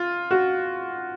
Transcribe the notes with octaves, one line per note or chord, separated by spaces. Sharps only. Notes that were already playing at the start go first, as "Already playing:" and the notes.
Already playing: F4
F#4